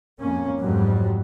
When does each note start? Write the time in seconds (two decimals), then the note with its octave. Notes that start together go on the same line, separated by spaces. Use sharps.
0.21 F2 A#3 C#4
0.60 F2 G#2 F#3 G3